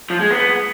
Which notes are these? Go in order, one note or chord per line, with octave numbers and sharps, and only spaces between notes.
F3
G#3
B3